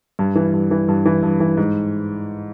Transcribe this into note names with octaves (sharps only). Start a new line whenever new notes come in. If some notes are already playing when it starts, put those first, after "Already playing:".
G2
E3
G2
E3
G2
E3
G2
E3
G#2